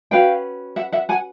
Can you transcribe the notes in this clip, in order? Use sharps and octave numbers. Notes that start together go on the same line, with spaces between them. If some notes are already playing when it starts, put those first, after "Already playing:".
C#4 F#4 B4 F5 G5
E5 F#5
E5 F#5
F#5 G#5